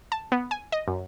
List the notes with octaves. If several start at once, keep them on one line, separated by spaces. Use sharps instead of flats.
A5
B3
G#5
D#5
F#2